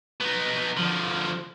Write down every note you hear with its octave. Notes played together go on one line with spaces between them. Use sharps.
B3 D#4
D3 F3